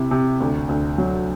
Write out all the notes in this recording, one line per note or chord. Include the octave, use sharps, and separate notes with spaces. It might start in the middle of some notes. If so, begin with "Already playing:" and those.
Already playing: C3 E4
C3
D2
D2
F#3